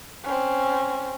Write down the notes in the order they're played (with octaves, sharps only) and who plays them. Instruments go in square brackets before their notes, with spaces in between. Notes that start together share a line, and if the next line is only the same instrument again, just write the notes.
[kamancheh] C4 C#4